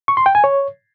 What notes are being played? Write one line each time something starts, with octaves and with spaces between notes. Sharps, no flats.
C#6
C6
G5
G#5
C#5